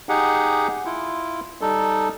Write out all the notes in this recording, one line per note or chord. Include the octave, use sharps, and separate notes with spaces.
D#4 G4 G#4 F#5
E4 F4
G3 D#4 A4